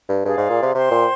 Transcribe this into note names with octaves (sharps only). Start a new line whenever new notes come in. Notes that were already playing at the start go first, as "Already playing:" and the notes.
G2
G2 G#4 D5 F5
G#2
A#2
C3
C3 C5 G5 C6
A#2